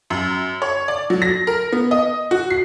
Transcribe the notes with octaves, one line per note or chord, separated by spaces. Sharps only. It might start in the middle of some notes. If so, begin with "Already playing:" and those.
F#2
C#5
D5
F#3
A#6
A#4
B3
D#5
F#4
C7